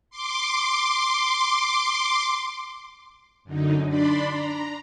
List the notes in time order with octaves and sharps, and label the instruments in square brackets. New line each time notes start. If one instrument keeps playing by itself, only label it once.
[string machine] C6 D6
F#2 D3 D#4
D4 D5 B5 C6
A#5